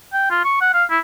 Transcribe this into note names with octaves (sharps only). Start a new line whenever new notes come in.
G5
F4
C#6
F#5
F5
E4